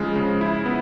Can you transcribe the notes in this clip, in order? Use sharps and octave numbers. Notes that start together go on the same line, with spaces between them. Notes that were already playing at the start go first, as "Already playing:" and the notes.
Already playing: C#3 F3 G#3
C#3
E4
B3